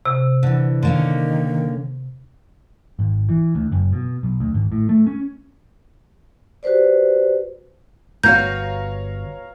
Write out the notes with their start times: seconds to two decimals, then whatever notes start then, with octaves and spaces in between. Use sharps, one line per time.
0.05 C3
0.43 D3 E3
0.83 D3 D#3 A#3 C#4
2.99 G#1
3.29 E3
3.55 D2
3.72 F#1
3.93 B2
4.23 B1
4.40 D2
4.54 G#1
4.72 A2
4.89 A3
5.07 C#4
6.63 F#4 G4 B4 C5 D5
8.23 G1 B3 F#4 C#5 F5 A#5 G6